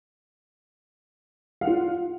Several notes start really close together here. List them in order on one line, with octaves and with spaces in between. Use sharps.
F5 F#5 F4